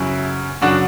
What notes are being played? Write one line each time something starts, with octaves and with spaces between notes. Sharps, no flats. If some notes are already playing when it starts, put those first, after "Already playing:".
Already playing: F#2 C#3 F#3 E4
F#2 C#3 F#3 D4 F#4